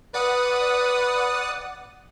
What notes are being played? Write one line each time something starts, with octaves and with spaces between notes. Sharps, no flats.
B4 D5 F#5 D#6